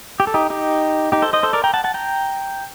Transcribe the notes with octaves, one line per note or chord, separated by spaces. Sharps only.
G4
A4
D#4 G4
D#4 G4
D#4 G4
A4 C5
C5 D#5
A4 C5
A#4 D5
G5 A#5
F#5 A5
F#5 A5
G5 A#5